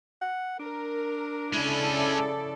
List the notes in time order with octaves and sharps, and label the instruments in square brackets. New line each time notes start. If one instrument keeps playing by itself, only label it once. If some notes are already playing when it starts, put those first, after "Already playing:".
[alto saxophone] F#5
[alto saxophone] D4 [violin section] A#4
[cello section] C#3 A4 D5 [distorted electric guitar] G#3 C#4 [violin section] E4